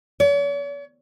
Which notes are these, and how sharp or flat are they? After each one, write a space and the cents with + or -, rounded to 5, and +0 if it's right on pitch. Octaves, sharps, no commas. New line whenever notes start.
C#5 +45